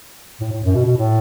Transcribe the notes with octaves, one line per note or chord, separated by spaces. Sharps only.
A2
A2
F#2
B2
B2
A2